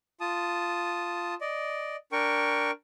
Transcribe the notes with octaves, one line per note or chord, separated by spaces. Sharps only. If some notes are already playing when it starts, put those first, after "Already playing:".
F4 A5 D#6
D5 D#5
D4 A#4 G5 C#6